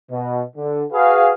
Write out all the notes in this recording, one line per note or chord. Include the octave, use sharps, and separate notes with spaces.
B2
D3
F#4 G#4 B4 F5